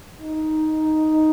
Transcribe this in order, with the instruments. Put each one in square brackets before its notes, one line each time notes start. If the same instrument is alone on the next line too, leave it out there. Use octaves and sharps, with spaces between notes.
[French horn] D#4